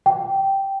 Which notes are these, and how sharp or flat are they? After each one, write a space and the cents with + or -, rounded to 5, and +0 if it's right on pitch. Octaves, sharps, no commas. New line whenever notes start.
G5 -5